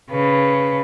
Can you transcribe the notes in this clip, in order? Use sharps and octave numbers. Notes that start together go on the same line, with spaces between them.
C#3 B4